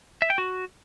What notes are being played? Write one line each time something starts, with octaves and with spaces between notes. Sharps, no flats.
E5
G5
F#4